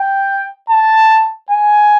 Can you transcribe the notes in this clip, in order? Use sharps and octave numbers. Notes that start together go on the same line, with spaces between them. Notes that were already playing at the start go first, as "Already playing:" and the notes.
Already playing: G5
A5
G#5